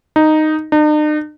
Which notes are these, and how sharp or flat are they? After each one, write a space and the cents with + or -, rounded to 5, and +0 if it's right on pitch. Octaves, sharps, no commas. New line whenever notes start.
D#4 -5
D#4 -45